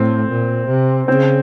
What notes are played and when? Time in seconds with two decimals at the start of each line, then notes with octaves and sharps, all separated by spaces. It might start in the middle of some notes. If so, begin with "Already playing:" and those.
Already playing: A2 C4
0.30 A#2
0.69 C3
1.08 C#3 C4